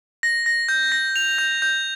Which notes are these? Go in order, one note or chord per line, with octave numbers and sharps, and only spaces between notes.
A#6
A#6
G6
A#6
F7
G6
G6